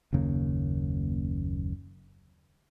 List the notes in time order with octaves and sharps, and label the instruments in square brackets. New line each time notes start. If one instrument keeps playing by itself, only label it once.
[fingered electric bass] F#1 D#2 C#3 A#3